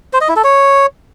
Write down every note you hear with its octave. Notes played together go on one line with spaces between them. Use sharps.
C5
D#5
E4
A4
C#5